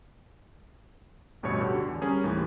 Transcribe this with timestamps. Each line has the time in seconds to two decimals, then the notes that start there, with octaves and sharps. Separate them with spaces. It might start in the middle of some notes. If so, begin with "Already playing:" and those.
1.43 A1 D2 G2 B2 C#5 C#7
1.61 F#4 G4 A4
1.74 D3
1.89 E2
2.01 G3 C#4 G#4 A#4
2.24 D#2 A2 C3 E3